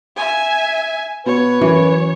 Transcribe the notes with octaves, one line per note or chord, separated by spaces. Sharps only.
E5 G#5
B2 B4 C#5
F#2 E3